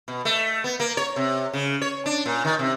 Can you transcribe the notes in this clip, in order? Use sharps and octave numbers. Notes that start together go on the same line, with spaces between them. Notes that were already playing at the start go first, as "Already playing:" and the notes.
B2
A3
B3
A#3
C#5
C3
C#3
C#5
D4
A#2
D#3
C3